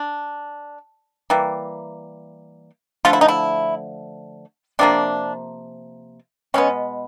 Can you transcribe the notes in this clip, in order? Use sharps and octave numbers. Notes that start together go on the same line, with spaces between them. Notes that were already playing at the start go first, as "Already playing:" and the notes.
Already playing: D4
E3 G3 A#3
D3 F3 A3 F4
E4
D#4
E4
C3 F3 A#3 D4
B2 G#3 B3 C#4